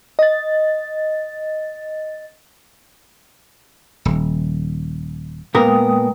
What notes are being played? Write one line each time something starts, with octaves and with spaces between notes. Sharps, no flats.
D#5 A6
D#1
A#2 G#3 B3 A#4 G5 D#6